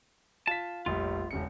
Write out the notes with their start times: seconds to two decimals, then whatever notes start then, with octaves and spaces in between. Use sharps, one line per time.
0.47 F4 A5 B6
0.86 F1 A#1 G3 F4
1.31 E1 C#3 C#7